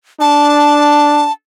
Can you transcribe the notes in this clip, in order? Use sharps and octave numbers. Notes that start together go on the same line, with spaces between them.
D4 A5